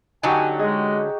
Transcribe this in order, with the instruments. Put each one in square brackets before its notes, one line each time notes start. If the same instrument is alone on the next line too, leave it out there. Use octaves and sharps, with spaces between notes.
[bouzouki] D3 F#3 C#4 [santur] D#4 F#4 G4 [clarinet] G#5
[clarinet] G#3 [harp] G#4 D#5